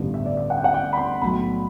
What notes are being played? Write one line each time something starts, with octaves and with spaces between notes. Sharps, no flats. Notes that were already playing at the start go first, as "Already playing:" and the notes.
Already playing: A1 G2 D3 G3 B3
E5
D5
E5
F#5
G5
F#5
G5
B5
C6
B1 A2 F#3 B5